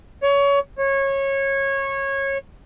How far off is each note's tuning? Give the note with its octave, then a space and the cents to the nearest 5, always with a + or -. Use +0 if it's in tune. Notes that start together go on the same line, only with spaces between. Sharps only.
C#5 +25
C#5 -20